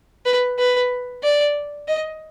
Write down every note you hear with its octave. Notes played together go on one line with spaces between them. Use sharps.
B4
B4
D5
D#5